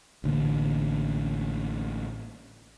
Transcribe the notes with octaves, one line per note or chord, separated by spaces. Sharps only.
A1 D3 D#3 A#3